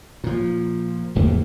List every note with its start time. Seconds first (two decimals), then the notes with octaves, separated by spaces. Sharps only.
0.24 A#2 F3
1.15 D1 E2 A3 A#3